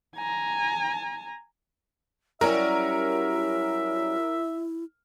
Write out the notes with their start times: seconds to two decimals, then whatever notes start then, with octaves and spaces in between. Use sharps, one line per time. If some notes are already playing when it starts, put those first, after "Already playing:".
0.16 G#5 A#5
2.41 F#3 G3 C#4 E4 A#4 E5